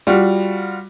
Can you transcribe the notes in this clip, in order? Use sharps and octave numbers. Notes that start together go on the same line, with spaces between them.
G3 F4 F#4